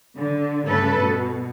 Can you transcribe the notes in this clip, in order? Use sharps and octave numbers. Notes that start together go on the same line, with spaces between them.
D3
G2 C#3 A3 A4 B4
B2